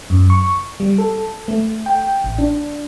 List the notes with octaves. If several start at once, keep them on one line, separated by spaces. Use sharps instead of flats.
F#2
C#6
G3
A4
A3
G5
A1
D4